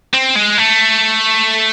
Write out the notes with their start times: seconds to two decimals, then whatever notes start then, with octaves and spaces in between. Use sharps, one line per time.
0.14 C4
0.36 G#3
0.58 A3